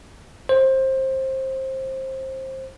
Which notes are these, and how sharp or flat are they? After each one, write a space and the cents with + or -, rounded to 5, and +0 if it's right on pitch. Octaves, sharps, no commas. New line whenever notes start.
C5 +20